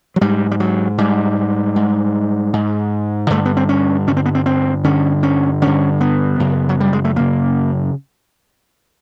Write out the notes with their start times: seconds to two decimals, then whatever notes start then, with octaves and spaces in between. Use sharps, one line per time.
0.16 F#3
0.21 G#2 G3
0.51 G3
0.60 F#3
0.98 G#2 G3
1.76 G#2
2.53 G#2
3.30 G2 D3 A3
3.45 B3
3.57 C4
3.69 C#4
4.07 G2 D3 C#4
4.17 C4
4.26 B3
4.35 C4
4.46 C4
4.84 G2 D3 C#4
5.23 C#4
5.62 G2 D3 C#4
6.01 B3
6.40 F#2 C#3
6.69 F#3
6.80 G3
6.93 G#3
7.05 A3
7.16 F#2 C#3 A#3